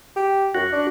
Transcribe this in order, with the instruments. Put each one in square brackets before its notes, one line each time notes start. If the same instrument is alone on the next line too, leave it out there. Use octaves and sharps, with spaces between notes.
[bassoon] G4
[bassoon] F#2 [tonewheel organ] F#4
[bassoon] D4